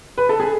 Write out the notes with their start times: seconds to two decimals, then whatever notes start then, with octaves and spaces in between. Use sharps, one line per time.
0.18 B4
0.29 A4
0.40 G#4